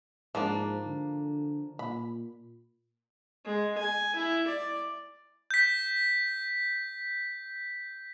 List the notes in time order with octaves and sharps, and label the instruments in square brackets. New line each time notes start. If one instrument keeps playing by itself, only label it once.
[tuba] G#2 [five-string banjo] F3 A#3 D4
[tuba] D3
[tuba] A#2 [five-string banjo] B5
[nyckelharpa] G#3
G#5
E4
D5
[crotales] G6 B6